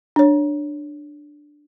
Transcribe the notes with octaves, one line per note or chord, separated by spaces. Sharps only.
D4 C#5